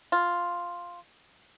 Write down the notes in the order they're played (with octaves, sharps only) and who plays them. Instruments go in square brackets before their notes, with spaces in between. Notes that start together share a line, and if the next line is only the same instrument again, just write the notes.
[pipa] F4